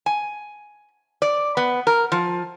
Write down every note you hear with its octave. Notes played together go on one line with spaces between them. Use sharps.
G#5
D5
B3
A#4
F3